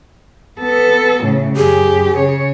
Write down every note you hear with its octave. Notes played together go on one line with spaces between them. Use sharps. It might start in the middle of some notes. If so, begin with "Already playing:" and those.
B3 A4
A2 C#3
F#2 G4 G#4
C#3 C#5